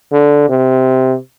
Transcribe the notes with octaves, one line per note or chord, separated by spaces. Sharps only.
D3
C3